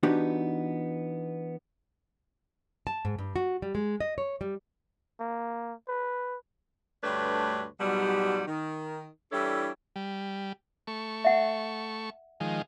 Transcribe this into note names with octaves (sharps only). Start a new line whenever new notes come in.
E3 B3 D4 D#4 F#4 G4
A5
G#2
G2
F#4
G3
G#3
D#5
C#5
G3
A#3
B4
D2 G2 A3 D4 B4 C#5
G#2 B2 F#3 G3
D#3
E3 G3 D4 E4 A4 C#5
G3
A3 C#6
E5 F#5
D#3 F3 G#3